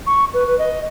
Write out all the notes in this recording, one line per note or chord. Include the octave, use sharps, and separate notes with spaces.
C#6
B4
B4
D#5